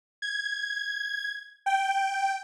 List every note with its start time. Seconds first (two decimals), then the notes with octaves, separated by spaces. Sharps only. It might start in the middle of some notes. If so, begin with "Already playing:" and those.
0.22 G#6
1.66 G5